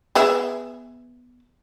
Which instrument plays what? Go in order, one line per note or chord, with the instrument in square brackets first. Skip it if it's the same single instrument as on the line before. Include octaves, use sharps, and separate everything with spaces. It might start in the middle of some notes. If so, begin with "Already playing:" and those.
[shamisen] B3 G#4 E5